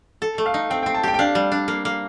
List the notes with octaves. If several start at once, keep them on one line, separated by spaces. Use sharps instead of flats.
A4
A3
F5
D#4
C4 G5
C4 G5
A5
G4 G5
G5
D4 F5
G3
D4
A#3
A#3